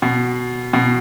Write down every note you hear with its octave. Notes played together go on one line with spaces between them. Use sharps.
B2
B2